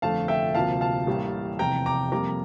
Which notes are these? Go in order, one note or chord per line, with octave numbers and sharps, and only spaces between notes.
G1 F2 D3 A3 F5 A5
E5 G5
D2 C3 F3 A#3 F5 A5
F5 A5
A1 A2 G3 A#3
F1 E2 C3 G5 A#5
A#5 D6
F2 C3 G3 A#3 A#5 D6